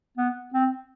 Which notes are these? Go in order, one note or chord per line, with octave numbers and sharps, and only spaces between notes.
B3
C4